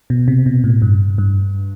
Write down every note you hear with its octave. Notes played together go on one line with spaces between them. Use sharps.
B2
C3
B2
A2
G2
G2